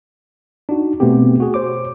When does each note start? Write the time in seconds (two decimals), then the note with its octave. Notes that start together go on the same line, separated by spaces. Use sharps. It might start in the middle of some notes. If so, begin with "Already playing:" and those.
0.69 D4 D#4 F#4
1.00 B2 A3 B3 C4 G4
1.40 F#4 G#4
1.54 C5 C#5 D6